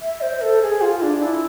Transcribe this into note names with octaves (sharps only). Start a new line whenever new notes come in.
E5
C5
A4
G#4
F4
D4
E4